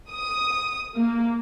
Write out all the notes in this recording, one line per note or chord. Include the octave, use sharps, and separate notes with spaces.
D#6
A#3